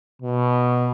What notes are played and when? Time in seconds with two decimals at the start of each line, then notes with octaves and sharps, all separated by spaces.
0.22 B2